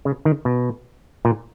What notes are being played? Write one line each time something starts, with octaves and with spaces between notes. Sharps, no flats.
C#3
D#3
B2
A#2